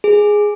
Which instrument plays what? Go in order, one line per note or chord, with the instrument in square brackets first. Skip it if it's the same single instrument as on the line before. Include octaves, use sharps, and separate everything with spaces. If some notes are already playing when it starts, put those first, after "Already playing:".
[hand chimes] G#4